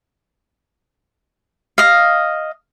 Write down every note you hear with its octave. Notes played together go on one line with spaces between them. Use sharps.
D#5 F5